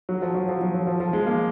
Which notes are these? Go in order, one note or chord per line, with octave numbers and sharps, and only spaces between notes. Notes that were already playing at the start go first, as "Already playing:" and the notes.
F#3
F3
F#3
F3
F#3
F#3
F3
F3
G#3
A#3